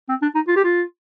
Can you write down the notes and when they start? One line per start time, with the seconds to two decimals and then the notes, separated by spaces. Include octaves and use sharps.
0.09 C4
0.22 D4
0.35 D#4
0.48 F4
0.56 G4
0.64 F4